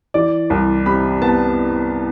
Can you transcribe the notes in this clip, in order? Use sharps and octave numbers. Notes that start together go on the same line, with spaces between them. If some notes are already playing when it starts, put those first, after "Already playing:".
E3 D5
C2
C3 B5
B3 A5